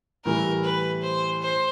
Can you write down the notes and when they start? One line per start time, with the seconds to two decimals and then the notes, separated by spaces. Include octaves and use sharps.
0.25 A2 E3 G3 A#4
0.64 B4
1.02 C5
1.41 C5